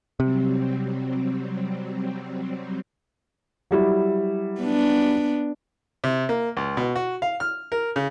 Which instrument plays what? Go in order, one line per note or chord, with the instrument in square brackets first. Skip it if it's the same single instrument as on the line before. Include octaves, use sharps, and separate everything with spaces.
[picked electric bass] C3 [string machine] F#3 G3 C4
[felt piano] F#3 G3 E4
[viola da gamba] B3 D4
[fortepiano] C3
A#3
C#2
B2
F#4
F5
F6
A#4
C#3